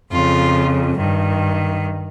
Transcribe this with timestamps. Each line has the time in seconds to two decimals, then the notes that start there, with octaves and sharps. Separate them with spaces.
0.11 F2 C#3 F4
0.98 G2 D#3